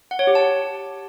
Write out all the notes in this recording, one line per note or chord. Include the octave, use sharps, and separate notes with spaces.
F#5
C#5
G4
A5